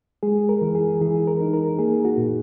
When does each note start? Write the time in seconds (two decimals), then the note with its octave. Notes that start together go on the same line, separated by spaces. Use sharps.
0.23 G#3 G#4
0.49 A#4
0.62 E3
0.75 G#4
1.01 E3 G#4
1.27 A#4
1.41 D#4
1.53 A#4
1.79 A#3 G#4
2.05 F#4
2.18 A#2